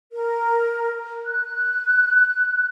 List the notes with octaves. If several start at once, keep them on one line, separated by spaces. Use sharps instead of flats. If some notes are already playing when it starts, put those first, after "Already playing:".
A#4
F#6